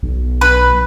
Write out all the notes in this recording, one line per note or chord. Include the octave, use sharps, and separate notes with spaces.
B1
B4